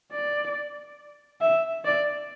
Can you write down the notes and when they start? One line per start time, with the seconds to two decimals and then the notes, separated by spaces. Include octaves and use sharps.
0.12 D5
1.41 E5
1.85 D5